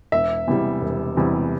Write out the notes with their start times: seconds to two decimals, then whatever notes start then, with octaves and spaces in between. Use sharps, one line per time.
0.12 E1 E5
0.48 E2 C3 E3 G3
0.81 E1
1.16 E2 C3 E3 G3